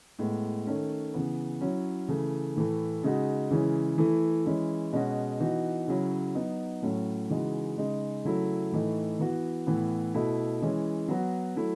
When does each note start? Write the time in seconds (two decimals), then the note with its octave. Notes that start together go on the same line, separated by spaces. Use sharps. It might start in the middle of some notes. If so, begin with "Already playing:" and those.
0.19 A2 G#3 B3
0.67 D#3 A3 C#4
1.14 C#3 E3 B3
1.61 F#3 C#4 E4
2.08 C#3 E3 A3
2.56 A2 E3 A3
3.03 C#3 G#3 D#4 F#4
3.50 C#3 E3 G#3 C#4 E4
3.98 E3 A3 E4
4.46 E3 G#3 C#4 E4
4.93 B2 G#3 C#4 F#4
5.40 E3 B3 D#4 F#4
5.88 C#3 F#3 C#4 E4
6.35 F#3 B3 D#4
6.82 A2 F#3 A3 C#4
7.30 C#3 E3 G#3 D#4 F#4
7.78 C#3 G#3 D#4
8.24 C#3 F#3 A3 E4
8.71 A2 E3 A3 D#4
9.19 E3 B3 F#4
9.67 A2 E3 B3
10.14 B2 A3 E4
10.62 E3 G#3 C#4
11.08 F#3 B3 F#4
11.56 F#3 A3 E4